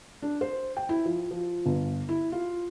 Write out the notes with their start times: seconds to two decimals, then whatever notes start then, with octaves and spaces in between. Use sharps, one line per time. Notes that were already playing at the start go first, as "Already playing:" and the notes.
0.22 D4
0.41 C5
0.77 G5
0.89 E4
1.06 F3
1.31 F3
1.66 G1
2.09 E4
2.32 F4